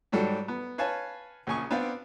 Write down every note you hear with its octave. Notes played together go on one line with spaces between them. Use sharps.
G#2 F#3 G3 A4 D5
B3
B4 C#5 F5 G#5 A5
A#1 C#3 G#5 C#6
B3 C4 D4 D5 F5